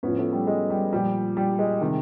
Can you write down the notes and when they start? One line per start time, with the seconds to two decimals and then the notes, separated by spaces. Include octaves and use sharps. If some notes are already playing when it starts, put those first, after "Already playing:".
0.03 A2 F3 B3 C#4
0.18 A3 B3
0.33 G3 A3
0.47 G#3
0.70 G3
0.92 A#2 F3 G3
1.37 G3
1.59 G#3
1.81 C3 D#3